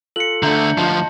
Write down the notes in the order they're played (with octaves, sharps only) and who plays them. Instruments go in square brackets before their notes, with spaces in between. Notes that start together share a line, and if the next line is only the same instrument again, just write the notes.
[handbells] F4 A4 [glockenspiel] C#7 F#7
[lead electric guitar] D3 A3 [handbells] D4 E5 A#5 [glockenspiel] G6
[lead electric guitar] D2 F3 [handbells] F4 D#5 [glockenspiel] A5